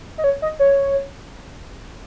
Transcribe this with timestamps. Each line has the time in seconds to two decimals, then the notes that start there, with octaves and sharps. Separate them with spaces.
0.18 D#5
0.24 C#5
0.42 D#5
0.59 C#5